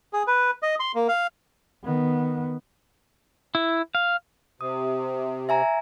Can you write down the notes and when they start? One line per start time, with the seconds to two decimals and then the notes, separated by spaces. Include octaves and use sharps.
0.13 G#4
0.27 B4
0.62 D#5
0.80 C6
0.95 A#3
1.08 F5
1.84 D#3 B3
3.55 E4
3.95 F5
4.61 C3 D#6
5.49 E5 G#5 A#5